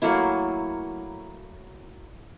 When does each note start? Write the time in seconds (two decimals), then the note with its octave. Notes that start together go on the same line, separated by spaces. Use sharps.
0.02 F#3 A3 A#3 E4